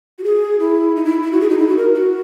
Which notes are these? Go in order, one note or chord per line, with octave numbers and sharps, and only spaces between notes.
F#4
G#4
E4
D#4
E4
E4
F#4
G#4
D#4
E4
F#4
A#4
F#4